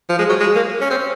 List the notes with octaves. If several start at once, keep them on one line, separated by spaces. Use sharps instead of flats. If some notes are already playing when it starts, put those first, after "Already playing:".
F3
G#3
F#3
G#3
A#3
C#4
C4